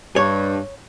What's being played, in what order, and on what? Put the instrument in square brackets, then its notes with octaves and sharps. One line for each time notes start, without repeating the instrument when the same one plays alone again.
[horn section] G2 [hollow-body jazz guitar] C#5